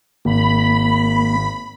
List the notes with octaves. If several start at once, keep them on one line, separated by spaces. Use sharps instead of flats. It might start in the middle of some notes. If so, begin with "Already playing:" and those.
G#1 A#3 B5